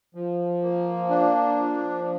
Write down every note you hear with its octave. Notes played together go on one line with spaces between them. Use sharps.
F3
A#3
D4
F3